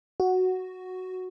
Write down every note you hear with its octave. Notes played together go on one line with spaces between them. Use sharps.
F#4